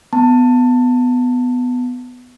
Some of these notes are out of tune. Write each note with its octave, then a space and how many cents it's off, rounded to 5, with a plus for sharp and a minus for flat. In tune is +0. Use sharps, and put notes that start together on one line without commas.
B3 +10 A5 +20